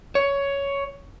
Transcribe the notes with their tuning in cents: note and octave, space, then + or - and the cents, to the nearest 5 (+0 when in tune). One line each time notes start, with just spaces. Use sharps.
C#5 +10